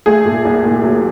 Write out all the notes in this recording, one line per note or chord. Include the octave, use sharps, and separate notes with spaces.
A3 G#4
A#2
C2
A#2
F#3